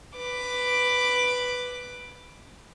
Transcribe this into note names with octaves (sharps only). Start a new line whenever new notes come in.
B4 D6